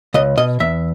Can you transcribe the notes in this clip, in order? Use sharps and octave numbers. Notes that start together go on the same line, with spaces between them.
C#2 D#5
B2 D#5
E2 E5